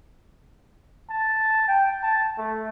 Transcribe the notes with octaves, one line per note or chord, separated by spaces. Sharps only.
A5
G5
A5
A3